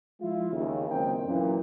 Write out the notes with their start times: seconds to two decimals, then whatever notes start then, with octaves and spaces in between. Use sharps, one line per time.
0.20 F3 G#3 E4 F4
0.52 D#2 C#3
0.89 F#1 C#2 C3 D#3 C4 G5
1.26 F#2 A#2 E3